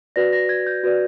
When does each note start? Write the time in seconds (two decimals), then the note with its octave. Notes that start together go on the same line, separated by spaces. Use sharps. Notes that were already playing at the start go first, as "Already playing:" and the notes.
0.16 F#4 B4 D5 A#6
0.33 A#6
0.49 G#6
0.67 G6
0.83 F#4 B4 D5